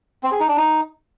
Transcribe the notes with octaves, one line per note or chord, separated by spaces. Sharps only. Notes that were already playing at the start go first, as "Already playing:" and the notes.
C4
G#4
D#4
D4
D#4